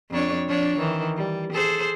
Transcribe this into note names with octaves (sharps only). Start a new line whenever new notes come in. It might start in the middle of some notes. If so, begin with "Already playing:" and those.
F2 D4 C#5
F3 D4 C#5
D#3 E3
G3
G#4 A4 C5